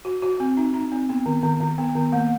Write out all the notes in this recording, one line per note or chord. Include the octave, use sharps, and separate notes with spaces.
F#4
F#4
C4
D#4
D#4
C4
B3
D#3
D#3
D#3
B3
D#3
A#3